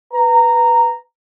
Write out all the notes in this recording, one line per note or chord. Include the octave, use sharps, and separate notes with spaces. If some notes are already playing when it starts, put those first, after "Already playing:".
B4 A#5